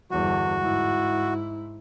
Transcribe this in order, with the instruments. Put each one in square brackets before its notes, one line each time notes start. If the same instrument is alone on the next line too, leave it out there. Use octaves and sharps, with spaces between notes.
[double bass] G1 E2 [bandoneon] F#4
[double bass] G#2 E4